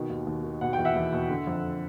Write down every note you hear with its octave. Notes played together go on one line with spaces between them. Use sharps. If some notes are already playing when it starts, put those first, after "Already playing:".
Already playing: B2 D#3
D#2
D#2
D#3
B2 F#5
G5
E2
E5 F#5
E2
B2
D3
F2